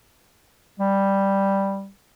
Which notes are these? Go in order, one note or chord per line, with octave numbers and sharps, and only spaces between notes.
G3